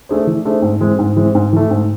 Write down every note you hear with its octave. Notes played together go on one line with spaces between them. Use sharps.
A3 D4 G#4 C5
E3
A3 D4 G#4 C5
G#2
E3 G#3 C4
G#2
E3 G#3 C4
G#2
E3 A3
G#2